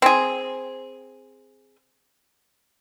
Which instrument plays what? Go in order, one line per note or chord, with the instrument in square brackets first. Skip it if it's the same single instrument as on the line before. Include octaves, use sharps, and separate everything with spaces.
[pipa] C4 G#4